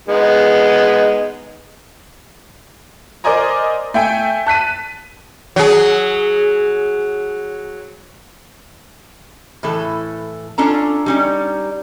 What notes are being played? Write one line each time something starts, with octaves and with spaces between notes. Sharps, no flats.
G#3 B3 D#4
A#4 C5 D5 D#5 G#5 A#5
A3 E5 G5 G#5
A5 F#6 B6 D#7
F#3 G#4
A2 E3 A4
C#4 D4 F4 A4 A#5
G3 C#4 D#4